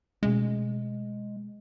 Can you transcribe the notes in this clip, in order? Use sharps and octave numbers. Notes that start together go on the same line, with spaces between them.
B2 G#3 A3 C#4